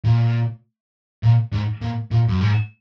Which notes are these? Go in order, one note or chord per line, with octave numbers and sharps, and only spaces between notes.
A#2
A#2
G#2
A#2
A#2
F#2
G#2